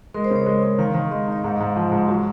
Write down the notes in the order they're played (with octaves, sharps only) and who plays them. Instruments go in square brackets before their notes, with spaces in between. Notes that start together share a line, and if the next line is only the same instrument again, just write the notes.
[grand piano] G#3 [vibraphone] A#4
[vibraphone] C5
[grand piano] C#3
[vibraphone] C#5
[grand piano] G#3
G#3
[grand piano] D#3 [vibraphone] F5
[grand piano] D#3
[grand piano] G#3 [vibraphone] D#5
[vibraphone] F5
[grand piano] D#4 [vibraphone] D#5
[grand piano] G#2 [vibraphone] F5
[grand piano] G#2
F3
G#2
[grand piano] F#3 [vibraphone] F#4